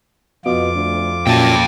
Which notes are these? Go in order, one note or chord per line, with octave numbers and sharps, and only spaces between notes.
F2 B2 F4 D6
D2
F#2 A#2 G5 A5